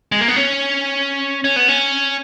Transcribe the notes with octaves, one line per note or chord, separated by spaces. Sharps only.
G#3
A#3
B3
C#4
C#4
B3
C#4